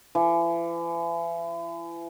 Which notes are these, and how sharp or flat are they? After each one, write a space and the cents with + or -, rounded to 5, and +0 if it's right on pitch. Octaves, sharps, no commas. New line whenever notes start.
E3 +40